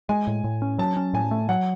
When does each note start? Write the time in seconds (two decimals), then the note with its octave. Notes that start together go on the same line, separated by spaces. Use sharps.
0.09 G#3 G#5
0.27 A2
0.44 A2
0.62 C#4
0.78 F#3 A5
0.97 C#4
1.14 A2 G#5
1.31 A3
1.49 F#3 F#5